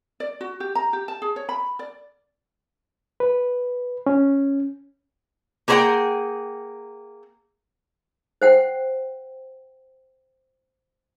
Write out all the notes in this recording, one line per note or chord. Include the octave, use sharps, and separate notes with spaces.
D5
F#4
G4
A#5
G4
A5
G#4
C#5
B5
D5
B4
C#4
A#3 G#4 B4 C#5 F#5 G5
C5 F#5 G5